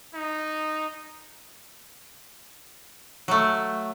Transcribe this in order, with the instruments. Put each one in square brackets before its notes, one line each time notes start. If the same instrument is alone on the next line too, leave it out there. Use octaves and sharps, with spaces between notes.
[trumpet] D#4
[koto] F#3 A3